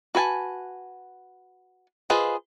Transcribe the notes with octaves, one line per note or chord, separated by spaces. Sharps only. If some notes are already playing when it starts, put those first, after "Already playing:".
F#4 B4 G#5 A5
F4 G#4 B4 C5 D#5